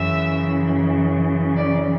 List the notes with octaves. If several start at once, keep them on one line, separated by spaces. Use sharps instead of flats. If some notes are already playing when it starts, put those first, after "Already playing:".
Already playing: F#2 C#3 E3 E5
D5